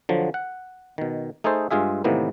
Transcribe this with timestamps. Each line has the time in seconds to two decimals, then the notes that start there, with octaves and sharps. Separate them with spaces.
0.09 D3 F3 F#3
0.34 F#5
0.98 B2 D#3
1.44 A3 D#4 G#4 A4 C5
1.71 G2 G#3 F4 G#4 E5
2.04 A2 C3 D#3 E3 A#3 B3